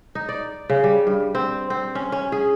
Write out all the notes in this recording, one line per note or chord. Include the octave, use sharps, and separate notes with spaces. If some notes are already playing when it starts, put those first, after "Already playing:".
D#4
D5
C#3
G3
G2
C4
C4
C#4
C#4
G#4